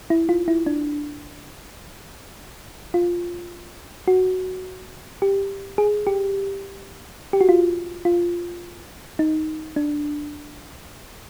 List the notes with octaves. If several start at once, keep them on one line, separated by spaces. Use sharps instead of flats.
E4
F4
E4
D4
F4
F#4
G4
G#4
G4
G4
F#4
F4
F4
D#4
D4